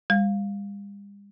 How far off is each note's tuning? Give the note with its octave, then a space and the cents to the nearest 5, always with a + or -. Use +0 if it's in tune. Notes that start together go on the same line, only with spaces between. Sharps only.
G3 +45